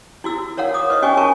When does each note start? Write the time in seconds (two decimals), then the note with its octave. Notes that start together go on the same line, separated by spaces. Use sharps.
0.24 E4 F#4 E6
0.57 A#4 C#5 F5 F#5
0.74 D6 D#6
0.90 B4 C#5 D#5 E5
1.02 C#4 F#4 D#5 G5 G#5 C#6
1.17 F4 A#4 G#5 A5 C#6